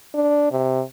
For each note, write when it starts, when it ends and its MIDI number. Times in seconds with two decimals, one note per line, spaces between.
0.14 0.49 62
0.51 0.82 48